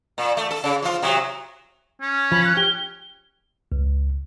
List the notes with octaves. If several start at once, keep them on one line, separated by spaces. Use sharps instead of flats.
A#2
A3
A4
C#3
F3 F4
C3 F#3
C#4
F3 B5
F#6
G4 G7
C#2